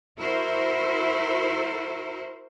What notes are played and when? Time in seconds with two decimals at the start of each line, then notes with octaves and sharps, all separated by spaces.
0.18 E4 F#4 A#4 C5